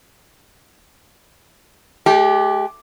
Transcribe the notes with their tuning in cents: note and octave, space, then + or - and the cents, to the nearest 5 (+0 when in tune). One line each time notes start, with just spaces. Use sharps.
G#3 +45 G4 +0